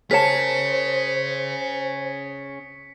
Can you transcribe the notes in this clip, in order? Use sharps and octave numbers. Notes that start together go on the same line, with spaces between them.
C#4 G#4 A#4 C5 C#5 A5 B6 C#7